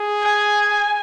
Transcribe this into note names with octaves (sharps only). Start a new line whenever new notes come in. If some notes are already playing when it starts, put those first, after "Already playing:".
Already playing: G#4
G#5